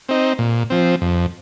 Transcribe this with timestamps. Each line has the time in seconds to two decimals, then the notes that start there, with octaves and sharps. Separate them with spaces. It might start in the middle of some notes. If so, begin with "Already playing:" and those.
0.09 C4 D#4
0.39 A#2
0.70 F3 C4
1.02 F2